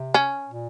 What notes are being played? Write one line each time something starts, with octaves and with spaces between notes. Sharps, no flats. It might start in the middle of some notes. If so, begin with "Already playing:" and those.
Already playing: C3
C#4
A#2